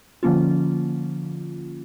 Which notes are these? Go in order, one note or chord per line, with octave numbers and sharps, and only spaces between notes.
D3 F3 A#3 C#4 F4